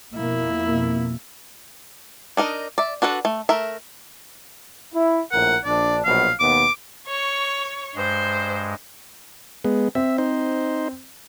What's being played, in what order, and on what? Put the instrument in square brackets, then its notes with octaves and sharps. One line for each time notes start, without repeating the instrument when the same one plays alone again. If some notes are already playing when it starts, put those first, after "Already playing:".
[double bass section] F2 B2 A#3 [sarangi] E4
[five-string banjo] D4 D#4 A#4 D#5
D5 E5
D4 F#4 A4 B4
A3
A3 A#4 E5
[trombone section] E4
[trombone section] A#1 A2 A#4 [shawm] F#5
[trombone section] A#1 D4 [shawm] D5
[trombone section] A#1 B2 F#3 [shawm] F5
[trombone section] D#2 B2 B3 [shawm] D6
[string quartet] C#5 C#6
[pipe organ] G2 G#3 [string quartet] C5
[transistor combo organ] G#3 B3
[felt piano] C4 [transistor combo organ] E5
[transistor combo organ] D#4 C5